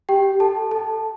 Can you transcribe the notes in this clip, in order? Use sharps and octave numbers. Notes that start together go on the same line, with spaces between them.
G4 G5
A4 A5
A4 A5